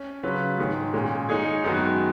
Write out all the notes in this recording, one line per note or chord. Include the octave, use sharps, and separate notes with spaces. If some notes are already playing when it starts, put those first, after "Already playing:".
Already playing: C#4
C#3 F#3 C#4 F4 B4
G#2 D#3 G#3
A#2 G#3 C#4
G#3 D#4 G#4 C#5
F#2 D#3 G#3 B3 F#4